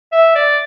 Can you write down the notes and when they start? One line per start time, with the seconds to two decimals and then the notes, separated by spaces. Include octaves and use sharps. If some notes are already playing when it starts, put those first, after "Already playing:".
0.12 E5
0.35 D5